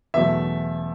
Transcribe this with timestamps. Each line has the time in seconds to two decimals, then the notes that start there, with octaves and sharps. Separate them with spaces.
0.14 E2 B2 F#3 A3 E5